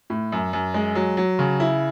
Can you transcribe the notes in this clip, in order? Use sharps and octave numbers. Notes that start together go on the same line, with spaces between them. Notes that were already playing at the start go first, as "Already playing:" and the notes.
A2
F#2
F#2
G#3
F#3
F#3
C#3
E4